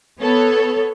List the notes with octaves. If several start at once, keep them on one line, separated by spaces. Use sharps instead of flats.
B3 A4 C#5